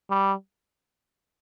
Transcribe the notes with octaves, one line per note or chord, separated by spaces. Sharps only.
G3